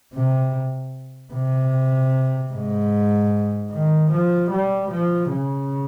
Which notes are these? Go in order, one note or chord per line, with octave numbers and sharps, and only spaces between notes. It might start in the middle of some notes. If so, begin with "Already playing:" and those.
C3
C3
G#2
D#3
F3
G3
F3
C#3